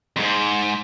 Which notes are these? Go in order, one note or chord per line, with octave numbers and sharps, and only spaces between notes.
F2 G#2